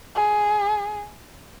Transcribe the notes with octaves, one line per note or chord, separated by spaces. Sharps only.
G#4